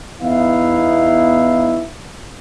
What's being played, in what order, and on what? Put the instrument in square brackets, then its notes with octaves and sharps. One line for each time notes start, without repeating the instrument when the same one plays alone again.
[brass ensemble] E2 B3 D#4 E4 E5 F5